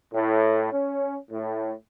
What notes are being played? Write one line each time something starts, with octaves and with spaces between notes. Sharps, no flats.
A2
C#4
A2